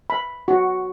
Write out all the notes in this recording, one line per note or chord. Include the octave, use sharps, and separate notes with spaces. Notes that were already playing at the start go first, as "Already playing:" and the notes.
B5
F#4